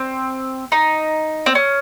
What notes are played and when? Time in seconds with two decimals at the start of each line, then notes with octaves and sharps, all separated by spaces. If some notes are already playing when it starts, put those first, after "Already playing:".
Already playing: C4
0.72 D#4
1.46 C4
1.55 C#4